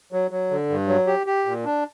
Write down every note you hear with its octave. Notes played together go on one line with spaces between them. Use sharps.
F#3
F#3
D3
G2
F#3
G4
G4
A#2
D4